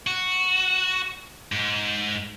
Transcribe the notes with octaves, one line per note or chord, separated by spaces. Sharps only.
F#4
G#2